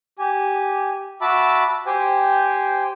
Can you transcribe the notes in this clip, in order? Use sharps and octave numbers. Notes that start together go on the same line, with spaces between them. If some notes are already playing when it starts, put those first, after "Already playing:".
G4 G#5
F#4 E5 A5 B5 D6 E6
G4 C5 G5 G#5